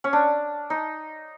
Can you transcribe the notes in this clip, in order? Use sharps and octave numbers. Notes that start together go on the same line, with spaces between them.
C#4
D4
D#4